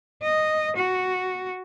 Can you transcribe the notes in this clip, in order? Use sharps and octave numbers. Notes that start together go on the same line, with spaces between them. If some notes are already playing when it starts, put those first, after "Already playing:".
D#5
F#4